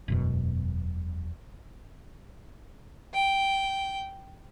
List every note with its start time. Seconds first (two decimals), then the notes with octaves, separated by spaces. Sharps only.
0.08 E1 F#2 B2
3.13 G5